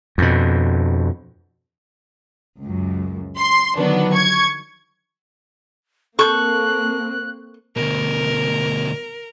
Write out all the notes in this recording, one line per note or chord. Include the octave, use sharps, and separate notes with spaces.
F2 B2
C#2 F#2
C6
D3 D#3 F3 F#3 B3 D4
C#6 G#6
A#3 C4 A4 C#6 F#6 G6
D2 B2 A#4